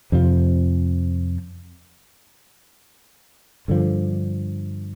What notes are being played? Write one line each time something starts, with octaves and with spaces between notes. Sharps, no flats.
F2 C3 F3
G2 D3 F3